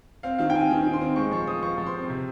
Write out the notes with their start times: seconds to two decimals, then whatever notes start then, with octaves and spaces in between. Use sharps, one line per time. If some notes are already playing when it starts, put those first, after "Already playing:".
0.23 C4 F5
0.38 D#3 F5
0.50 G5
0.54 C4 G#5
0.71 D#3
0.86 D#3
0.93 C6
1.01 C4
1.16 G#3 C#6
1.31 F3 C#6
1.47 F3 D#6
1.63 F3 C#6
1.78 F3
1.86 C6
1.94 C4
2.10 C3